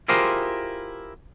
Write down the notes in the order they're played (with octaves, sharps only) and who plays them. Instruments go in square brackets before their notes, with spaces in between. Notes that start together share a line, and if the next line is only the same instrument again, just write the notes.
[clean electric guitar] E4 F4 G4 G#4 A#4 C5